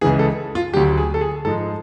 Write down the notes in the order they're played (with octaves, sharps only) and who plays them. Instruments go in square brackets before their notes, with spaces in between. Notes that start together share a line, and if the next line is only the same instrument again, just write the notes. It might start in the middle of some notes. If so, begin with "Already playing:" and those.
[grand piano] C#2 C#3 E3 G#4
A4
F4
D2 D3 F#3 G4
G#4
A4
G#4
G#2 F3 G#3 A4